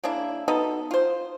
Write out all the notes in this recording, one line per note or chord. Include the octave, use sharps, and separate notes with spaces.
C#3 A#3 D4 E4
B2 B3 D#4 A4
F4 C5